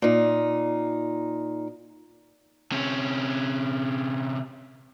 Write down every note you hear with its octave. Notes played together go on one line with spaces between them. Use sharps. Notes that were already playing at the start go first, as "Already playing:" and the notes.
A#2 D#4
C3 C#4